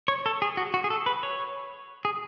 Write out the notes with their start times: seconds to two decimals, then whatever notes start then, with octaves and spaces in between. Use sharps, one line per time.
0.08 C#5
0.26 A4
0.42 G#4
0.57 F#4
0.74 F#4
0.84 G#4
0.90 A4
1.06 B4
1.23 C#5
2.05 G#4